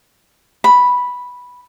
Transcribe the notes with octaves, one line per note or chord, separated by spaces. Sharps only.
B5